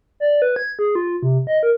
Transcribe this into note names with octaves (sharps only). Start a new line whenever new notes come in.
D5
B4
G#6
G#4
F4
C3
D#5
A#4